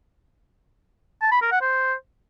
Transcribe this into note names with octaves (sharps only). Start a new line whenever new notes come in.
A5
B5
A#4
F#5
C5